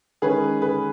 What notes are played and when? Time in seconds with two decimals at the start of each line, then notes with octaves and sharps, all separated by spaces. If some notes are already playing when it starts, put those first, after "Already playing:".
0.22 D#3 G#3 C#4 G#4 B4
0.62 G#4 B4